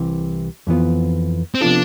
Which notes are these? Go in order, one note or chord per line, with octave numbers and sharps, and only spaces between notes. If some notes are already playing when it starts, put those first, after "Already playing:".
Already playing: C2 C3 E3
F2 E3 B3 F4
C4
C3 F3 B3 D4 F4 A4